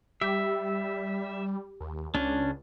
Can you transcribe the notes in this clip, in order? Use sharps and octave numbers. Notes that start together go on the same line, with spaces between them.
G3 G4 E5
D#2
C#2 C#4 D4